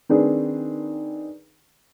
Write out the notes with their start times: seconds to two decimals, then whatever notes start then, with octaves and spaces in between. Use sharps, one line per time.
0.09 D#3 C4 D4 G#4 B4